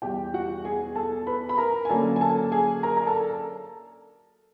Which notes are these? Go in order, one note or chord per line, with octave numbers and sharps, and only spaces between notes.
E2 B2 G3 G4 G5
F#4 F#5
G#4 G#5
A4 A5
B4 B5
B5
A#4 A#5
G#5
D3 F#3 A#3 C#4 A4 A5
G#5
A4 A5
G#4 G#5
A#4 A#5
A#5
A4 A5